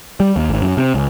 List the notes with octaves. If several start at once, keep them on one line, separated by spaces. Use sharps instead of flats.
G3
D#2
G#1
F#2
C3
C#2